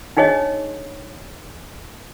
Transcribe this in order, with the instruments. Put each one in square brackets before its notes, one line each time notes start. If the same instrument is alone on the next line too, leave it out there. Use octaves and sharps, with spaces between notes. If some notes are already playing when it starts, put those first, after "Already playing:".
[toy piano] D4 D#4 G#4 C#5 D#5